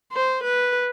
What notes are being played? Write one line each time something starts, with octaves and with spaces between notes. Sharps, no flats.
C5
B4